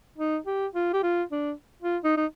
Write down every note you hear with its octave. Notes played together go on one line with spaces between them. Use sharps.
D#4
G4
F4
G4
F4
D4
F4
D#4
D#4